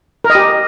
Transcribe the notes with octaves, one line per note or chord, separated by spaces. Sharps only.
A#4
D#5
G4